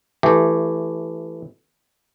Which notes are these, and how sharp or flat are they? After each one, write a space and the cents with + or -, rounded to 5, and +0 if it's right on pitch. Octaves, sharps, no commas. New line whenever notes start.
E3 +10 A3 +0 G4 +0